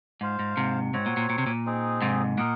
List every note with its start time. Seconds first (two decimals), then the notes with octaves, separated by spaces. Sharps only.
0.21 G#2 F4 C5 F5
0.39 G#2
0.57 G#2 C3
0.93 G#2 C4 F#4 C#5 F#5
1.06 A#2
1.17 A#2
1.30 A#2
1.38 C3
1.47 A#2
1.65 C4 D#4 G#4
2.02 G#2 C3
2.37 A#2 A#4 D#5 F#5